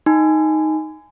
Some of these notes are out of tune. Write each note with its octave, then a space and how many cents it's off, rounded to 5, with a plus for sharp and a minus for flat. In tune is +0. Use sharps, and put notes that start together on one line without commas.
D#4 +5 G#5 +0 C6 -45